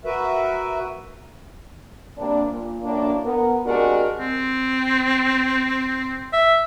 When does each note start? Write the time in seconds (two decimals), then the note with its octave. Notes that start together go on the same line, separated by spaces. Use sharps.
0.05 F#4 A#4 B4 E5
2.18 C3 G3 A#3 D4
2.50 A#2
2.83 F#2 A2 A#3 D4
3.24 B3 A#4
3.65 C3 G#3 D4 F#4 G4 A#4
4.19 C4
6.33 E5